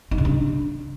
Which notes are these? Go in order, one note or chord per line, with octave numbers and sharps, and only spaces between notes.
D#4
C#3
D4